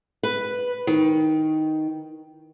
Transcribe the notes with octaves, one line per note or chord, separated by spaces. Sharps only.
B4
D#3